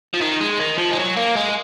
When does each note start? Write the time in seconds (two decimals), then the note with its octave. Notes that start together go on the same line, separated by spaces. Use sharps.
0.14 F3
0.21 D#3
0.40 G#3
0.60 D#3
0.78 F3
0.91 G#3
0.97 F#3
1.17 A#3
1.36 G#3